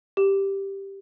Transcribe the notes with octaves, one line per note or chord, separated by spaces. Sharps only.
G4